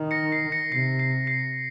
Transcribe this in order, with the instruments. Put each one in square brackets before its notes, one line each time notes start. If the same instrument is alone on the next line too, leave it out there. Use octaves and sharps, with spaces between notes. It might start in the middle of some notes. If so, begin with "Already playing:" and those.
Already playing: [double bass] D#3
[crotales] A#6 C#7
C7
A#6 C#7
[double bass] C3 [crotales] C7
[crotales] C7
C7